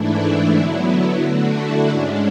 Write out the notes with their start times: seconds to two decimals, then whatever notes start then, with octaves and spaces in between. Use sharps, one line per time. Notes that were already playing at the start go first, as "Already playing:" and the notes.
Already playing: G#2 E3 A3 D4 E4
0.21 E4
0.54 D3 F#3 B3 E4
0.88 E4
1.21 D3 A3 D4 F#4
1.54 E4
1.87 G#2 G#3 C#4 D4